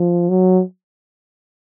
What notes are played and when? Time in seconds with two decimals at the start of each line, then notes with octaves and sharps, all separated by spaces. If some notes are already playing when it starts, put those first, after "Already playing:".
Already playing: F3
0.29 F#3